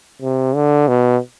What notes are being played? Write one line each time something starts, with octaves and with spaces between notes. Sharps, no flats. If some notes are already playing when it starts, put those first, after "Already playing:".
C3
D3
B2